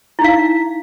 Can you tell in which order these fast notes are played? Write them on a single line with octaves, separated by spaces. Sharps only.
E4 D#4 F5